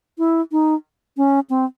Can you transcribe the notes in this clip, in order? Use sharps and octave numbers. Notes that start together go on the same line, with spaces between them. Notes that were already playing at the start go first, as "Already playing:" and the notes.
E4
D#4
C#4
C4